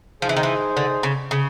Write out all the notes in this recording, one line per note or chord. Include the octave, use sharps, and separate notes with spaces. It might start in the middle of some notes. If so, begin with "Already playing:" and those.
F3 D#4 G#4 C5
E3
D#3
E3
D3
C#3
C#3